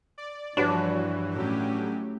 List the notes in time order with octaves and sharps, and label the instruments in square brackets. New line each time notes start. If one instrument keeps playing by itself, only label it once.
[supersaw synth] D5
[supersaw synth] G2 E3 [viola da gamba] F3 [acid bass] D4 [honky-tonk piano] F#4 B4 C#5
[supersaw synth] A2 F#3 G4 [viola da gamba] A3 C#4